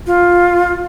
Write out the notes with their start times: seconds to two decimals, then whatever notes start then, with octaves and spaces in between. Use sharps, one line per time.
0.07 F4